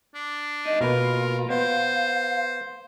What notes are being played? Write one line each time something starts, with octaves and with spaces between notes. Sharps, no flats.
D4
F2 D#4
B2 A#3 F4 A#4 B4
B3 C5 F5